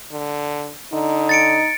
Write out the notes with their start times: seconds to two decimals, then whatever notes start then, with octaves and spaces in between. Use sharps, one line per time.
0.12 D3
0.93 D3 D#4
1.29 A6 C#7 D7